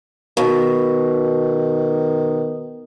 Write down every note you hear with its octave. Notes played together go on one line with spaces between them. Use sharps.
B2 D#3